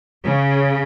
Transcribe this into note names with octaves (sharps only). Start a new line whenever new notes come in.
C#3